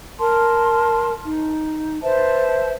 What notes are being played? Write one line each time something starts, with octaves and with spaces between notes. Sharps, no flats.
A#4 A5 C6
D#4
B4 C5 E5 A5